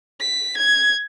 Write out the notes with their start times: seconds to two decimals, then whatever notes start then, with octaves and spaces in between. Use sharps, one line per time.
0.20 B6
0.58 G#6